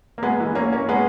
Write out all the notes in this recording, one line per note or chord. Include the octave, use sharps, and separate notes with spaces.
A#3
G#3 B3
E3
A#3 C#4
A#3 C#4
G#3 B3